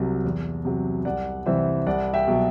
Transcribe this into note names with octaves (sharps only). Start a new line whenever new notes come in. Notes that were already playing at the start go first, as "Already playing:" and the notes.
Already playing: C2 C3 F#3
E2
C3 F#3
C2 D5 F#5
C3 E3 G3 C5 E5
C2 D5 F#5
E5 G5
B2 F#3